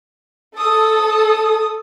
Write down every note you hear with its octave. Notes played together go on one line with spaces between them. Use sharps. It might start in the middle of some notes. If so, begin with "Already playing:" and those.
A4 D#6